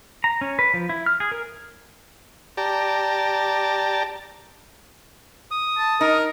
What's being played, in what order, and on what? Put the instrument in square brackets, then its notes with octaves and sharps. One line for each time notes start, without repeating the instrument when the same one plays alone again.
[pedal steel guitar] A#5
C#4
B4
F3
E4
F6
G#4
A#4
[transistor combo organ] G4 D5 A5 A#5
[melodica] D#6
[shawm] A5
[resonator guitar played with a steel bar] D#4 [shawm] A#4